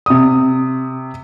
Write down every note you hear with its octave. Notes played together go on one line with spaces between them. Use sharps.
C3 D#6